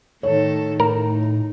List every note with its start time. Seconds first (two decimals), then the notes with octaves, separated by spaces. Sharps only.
0.23 A2 D#3 A4 C#5
0.80 A2 D#4 A#4